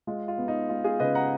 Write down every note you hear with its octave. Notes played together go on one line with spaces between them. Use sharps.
G#3 F4
F4
B3
D#4
G#3 F4
F4 G#4
C#3 B4 D#5
F#5 A#5